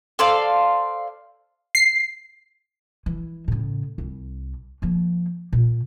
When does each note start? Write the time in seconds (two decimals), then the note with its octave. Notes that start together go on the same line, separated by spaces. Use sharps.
0.19 A4 C5 D5 F5
1.75 C7
3.06 E3
3.48 A2 C#3
3.98 C2
4.82 F3 A#3
5.53 A#2